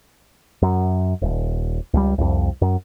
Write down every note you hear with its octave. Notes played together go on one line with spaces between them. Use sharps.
F#2
D#1
C#2 G3
C2 F2
F#2